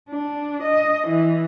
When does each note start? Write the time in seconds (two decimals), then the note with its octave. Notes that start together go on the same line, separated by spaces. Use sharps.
0.10 D4
0.63 D#5
1.08 E3